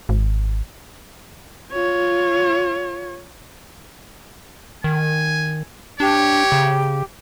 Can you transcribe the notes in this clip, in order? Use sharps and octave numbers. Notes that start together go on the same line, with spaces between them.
G#1
F4 C#5
D#3 G#5
D4 G4 C#5
C#3